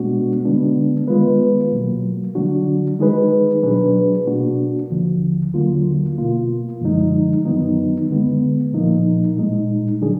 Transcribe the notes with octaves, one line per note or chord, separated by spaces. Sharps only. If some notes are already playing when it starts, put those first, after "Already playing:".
Already playing: B2 G#3 B3 D4 F#4
D3 G#3 B3 D4
D#3 G#3 B3 F4 B4
B2 F#3 A#3
D2 D3 F#3 D4 F#4
D#3 G#3 D#4 G#4 B4
B2 F#3 D4 G#4 B4
B2 A#3 D4 F#4
D#2 D3 F3
D#2 D3 F#3 A#3 F4
B2 A#3 F4
F#2 D3 F3 G#3 D#4
F#2 D#3 F#3 B3 D#4
D2 D3 G#3 B3
A#2 F3 A#3 D#4
A#2 G#3 D#4
D3 F#3 D4 G#4